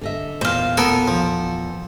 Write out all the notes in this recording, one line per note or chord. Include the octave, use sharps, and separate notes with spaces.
D3 D#5 E5
E2 A#2 C5 F5
B3 A4 A#4 G#5
F3